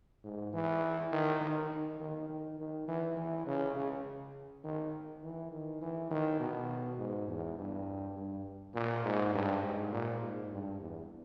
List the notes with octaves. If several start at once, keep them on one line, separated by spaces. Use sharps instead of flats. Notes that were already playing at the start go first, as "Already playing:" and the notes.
G#2
E3
D#3
D#3
D#3
D#3
D#3
D#3
E3
E3
C#3
C#3
D#3
E3
D#3
E3
D#3
B2
G#2
E2
G2
G2
A#2
G#2
G2
G#2
A#2
G#2
G2
E2